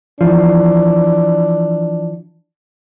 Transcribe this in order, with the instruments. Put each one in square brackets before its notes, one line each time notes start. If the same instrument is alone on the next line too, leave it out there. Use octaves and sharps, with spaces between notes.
[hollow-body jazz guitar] E3 F3 [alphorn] D4